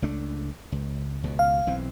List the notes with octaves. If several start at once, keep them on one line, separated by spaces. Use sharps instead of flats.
C#2 A3 D4
C#2
C#2 B2
F5
B1 E3 C4